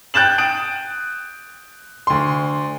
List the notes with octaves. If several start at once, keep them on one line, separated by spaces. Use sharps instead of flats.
G5 F#6 G6 A6 E7 F#7
D#6 A6 D7 F#7
D2 C6